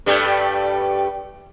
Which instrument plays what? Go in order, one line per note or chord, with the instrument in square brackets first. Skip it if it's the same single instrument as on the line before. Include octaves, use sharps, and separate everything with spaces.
[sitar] G2 G3 A3